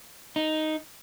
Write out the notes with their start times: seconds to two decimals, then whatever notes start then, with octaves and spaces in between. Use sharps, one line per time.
0.36 D#4